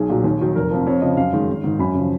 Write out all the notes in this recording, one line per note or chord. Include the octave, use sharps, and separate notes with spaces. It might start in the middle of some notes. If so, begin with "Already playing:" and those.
Already playing: B1 G#4
A#2 F#3
D#2
D#3 F#3
F1 A#4
F2 F3
F2 C#5
C#3 F3 D#5
F#2 F5
D#3 G#3
G#1
G#2 D#3
F#2 B5
C#3 F3